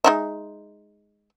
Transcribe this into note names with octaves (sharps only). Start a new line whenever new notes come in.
G#3 D#4 E5